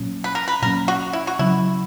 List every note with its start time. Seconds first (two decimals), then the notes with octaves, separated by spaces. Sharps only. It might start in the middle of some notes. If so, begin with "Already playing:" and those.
Already playing: A#2 F#3 A#3 C#4
0.24 B4
0.35 A#4
0.48 B4
0.62 A#2 F#3 A#3 C#4 A#4
0.88 F#4
1.13 E4
1.27 F#4
1.39 C#3 F#3 C#4 E4